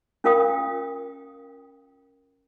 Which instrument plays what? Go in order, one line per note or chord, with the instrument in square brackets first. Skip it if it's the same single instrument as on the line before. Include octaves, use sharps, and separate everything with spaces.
[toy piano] C#4 F4 A#4 F5 G5 D#6